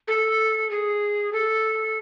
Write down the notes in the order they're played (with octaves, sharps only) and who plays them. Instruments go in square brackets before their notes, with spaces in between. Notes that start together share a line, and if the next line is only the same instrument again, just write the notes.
[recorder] A4
G#4
A4